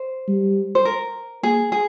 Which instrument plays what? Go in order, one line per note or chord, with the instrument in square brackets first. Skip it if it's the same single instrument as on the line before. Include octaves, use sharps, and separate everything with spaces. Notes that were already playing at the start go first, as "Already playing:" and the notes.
Already playing: [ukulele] C5
[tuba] G3
[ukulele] C5
A#4
[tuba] A#3 [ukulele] G#4
[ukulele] G#4